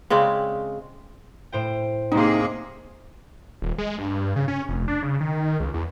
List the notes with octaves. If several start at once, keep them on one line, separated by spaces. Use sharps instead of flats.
C#3 G#3 C4 D5
A2 C5 G5
C3 A#3 D#4 G#4
D#1
G#3
G2
C#3
C#4
F1
D4
C#3
D#3
C#2
E2